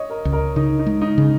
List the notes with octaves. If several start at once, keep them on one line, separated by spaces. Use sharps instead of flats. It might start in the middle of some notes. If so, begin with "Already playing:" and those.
Already playing: C#5 D#5
A#4
C#2
A#4
C#3 D#4
D#4
G#3
D#4
C#3